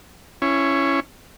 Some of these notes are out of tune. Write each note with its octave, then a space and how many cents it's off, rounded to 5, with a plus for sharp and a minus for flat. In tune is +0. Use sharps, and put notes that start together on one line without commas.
C#4 +0 E4 +25